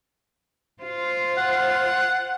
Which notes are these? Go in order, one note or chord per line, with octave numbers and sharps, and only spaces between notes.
F4 C5
F#5